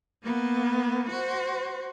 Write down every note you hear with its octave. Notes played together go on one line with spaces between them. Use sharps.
A#3 B3
F#4 C5